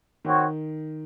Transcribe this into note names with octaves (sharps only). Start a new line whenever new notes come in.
D#3 C4 F#4 C#5